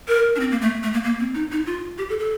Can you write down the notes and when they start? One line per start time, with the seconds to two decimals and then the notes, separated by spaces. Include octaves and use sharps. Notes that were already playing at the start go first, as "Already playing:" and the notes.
0.08 A#4
0.36 D4
0.40 C4
0.51 A#3
0.62 A3
0.83 A3
0.94 A#3
1.04 A#3
1.20 C4
1.35 D#4
1.52 D#4
1.66 F4
1.98 G4
2.09 A4
2.19 A4